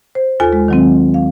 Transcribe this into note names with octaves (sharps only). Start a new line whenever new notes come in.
C5
D#2 F4 A4 G#5
G#3
D#3 F#3 C4
F5